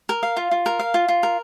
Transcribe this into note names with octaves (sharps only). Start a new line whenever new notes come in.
A#4
F5
F4
F4
A#4
F5
F4
F4
A#4